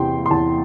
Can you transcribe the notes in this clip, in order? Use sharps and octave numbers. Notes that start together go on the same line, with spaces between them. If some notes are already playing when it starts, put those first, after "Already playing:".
Already playing: E2 C3 E3 G5 C6
C6
E2 A5